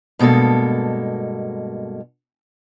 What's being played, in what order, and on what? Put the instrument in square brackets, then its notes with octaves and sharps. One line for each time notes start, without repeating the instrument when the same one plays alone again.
[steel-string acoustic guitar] G2 B2 G#3 A#3 A4